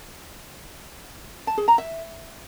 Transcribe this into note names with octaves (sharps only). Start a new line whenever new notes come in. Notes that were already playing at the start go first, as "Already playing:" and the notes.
A5
G#4
A#5
E5